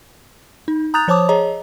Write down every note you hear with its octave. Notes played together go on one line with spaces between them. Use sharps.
D#4
A#5 D#6 F#6 G6 A6 F7
F3 C5 C#5 A5 D6 D#6
G#4 C#5 D#5 A#5